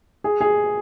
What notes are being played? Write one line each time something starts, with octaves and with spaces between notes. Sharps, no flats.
G#4
G#4